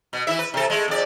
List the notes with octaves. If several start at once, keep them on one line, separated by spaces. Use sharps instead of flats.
B2
E3 E4 E5
B4
C3 A4
G#3 A3
F2 D5